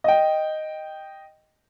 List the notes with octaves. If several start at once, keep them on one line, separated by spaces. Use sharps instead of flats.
D#5 G5